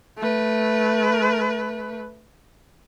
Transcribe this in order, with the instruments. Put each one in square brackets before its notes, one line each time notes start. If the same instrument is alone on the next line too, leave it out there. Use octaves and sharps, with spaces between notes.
[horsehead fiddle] A3 B4